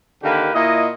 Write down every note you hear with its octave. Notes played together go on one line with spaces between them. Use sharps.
D3 D#3 A#3 G4 B4
A#2 E4 D#5